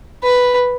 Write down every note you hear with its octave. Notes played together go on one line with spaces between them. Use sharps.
B4